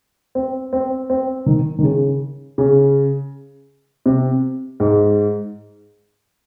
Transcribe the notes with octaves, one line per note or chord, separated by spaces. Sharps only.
C4
C4
C4
D#3
D#3
C#3
C#3
C3
G#2